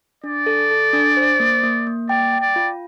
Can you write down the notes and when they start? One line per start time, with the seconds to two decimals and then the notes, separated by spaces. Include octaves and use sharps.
0.24 D4 D5
0.46 A4
0.71 A4
0.93 D4
1.17 C5
1.40 A#3
1.63 A#3
1.87 A#3
2.09 D5 G5
2.33 G5
2.41 D5
2.56 F4